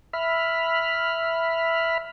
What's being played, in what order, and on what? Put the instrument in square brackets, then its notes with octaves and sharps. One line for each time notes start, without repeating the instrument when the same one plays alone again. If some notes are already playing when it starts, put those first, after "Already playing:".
[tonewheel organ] E5 B5 F6